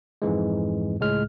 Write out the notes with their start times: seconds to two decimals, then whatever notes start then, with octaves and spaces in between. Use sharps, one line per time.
0.22 F2 G#2 E3 G#3
1.00 C#2 A2 G#3 F6